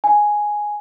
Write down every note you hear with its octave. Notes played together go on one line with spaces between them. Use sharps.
G#5